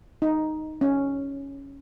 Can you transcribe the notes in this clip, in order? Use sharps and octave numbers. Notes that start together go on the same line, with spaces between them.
D#4
C#4